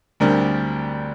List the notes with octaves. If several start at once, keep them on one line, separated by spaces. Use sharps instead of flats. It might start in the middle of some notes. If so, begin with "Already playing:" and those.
D2 D3 G3 C4 A#4